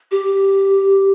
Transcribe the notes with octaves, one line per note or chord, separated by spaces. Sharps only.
G4